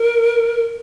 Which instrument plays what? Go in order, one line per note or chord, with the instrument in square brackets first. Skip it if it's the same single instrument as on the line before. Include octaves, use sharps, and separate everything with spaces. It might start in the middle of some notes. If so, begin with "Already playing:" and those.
Already playing: [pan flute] A#4